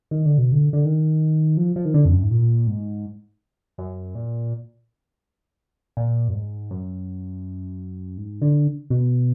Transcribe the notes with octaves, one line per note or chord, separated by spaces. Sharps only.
D#3
D3
B2
D3
D3
D#3
F3
F3
D#3
D3
F2
F#2
G#2
A#2
G#2
F#2
A#2
A#2
F#2
G#2
F#2
G#2
D3
B2